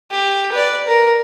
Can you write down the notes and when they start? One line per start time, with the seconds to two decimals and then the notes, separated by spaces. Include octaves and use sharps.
0.11 G4
0.51 B4 D5
0.87 A#4